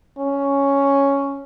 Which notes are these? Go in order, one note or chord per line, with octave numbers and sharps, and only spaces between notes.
C#4